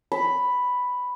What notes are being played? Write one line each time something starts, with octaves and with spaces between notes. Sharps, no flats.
B5